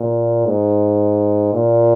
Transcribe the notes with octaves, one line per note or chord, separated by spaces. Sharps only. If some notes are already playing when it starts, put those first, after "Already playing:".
Already playing: A#2
G#2
A#2